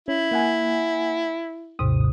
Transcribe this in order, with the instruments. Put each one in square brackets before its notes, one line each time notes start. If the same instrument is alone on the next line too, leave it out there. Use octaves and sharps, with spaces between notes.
[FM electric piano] C#4 [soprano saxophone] E4
[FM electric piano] A#3 F#5 G#5
[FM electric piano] A1 D#6 [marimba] D#2 G#2 C3